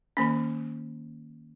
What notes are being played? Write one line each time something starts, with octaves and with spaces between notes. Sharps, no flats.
D#3 A#3 C#4